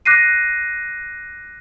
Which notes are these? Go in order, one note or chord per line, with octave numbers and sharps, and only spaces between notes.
D6 F#6 A#6 C7 D#7